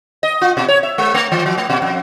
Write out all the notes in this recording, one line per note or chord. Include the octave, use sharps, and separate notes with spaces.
D#5
F4
B2
C#5
E5
G#3
A3
E3
F3
A3
B2
F2